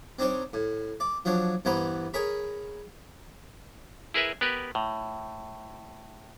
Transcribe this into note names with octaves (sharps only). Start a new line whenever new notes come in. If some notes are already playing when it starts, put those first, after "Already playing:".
C4 D4 D#4 C5 C#5
A2
D5
F3 F#3 D4 C#5
G2 E3 B3 C5 A#5 B5
G#4 A#4 C#5 B5
E4 G#4 A#4 B4 E5
B3 G4 A#4 B4
A2